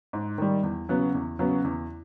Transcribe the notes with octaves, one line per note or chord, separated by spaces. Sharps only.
G#2
D#3 G3
E2
C#3 F#3 B3
E2
C#3 F#3 B3
E2